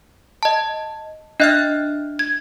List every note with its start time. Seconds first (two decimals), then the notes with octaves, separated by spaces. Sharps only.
0.43 D#5 A5
1.40 D4 D#5 E5 F6 F#6
2.19 G#6